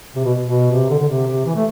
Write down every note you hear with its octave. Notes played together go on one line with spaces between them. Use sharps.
C3
B2
B2
C3
D3
D3
C3
C3
E3
A3